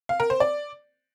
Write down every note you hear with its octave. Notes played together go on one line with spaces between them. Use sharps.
F5
A#4
C5
D5